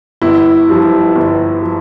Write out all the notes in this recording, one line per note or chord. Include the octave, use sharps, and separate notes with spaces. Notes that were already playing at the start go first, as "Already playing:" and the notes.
G1 E4
G2 F3
G1
F3